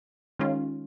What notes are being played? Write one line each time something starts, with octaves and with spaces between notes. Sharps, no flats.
D#3 G#3 C#4 F4